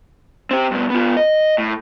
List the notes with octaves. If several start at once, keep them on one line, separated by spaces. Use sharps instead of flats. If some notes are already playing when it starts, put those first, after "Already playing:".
C4 G4
G2 B2
B3 F4
D#5
A2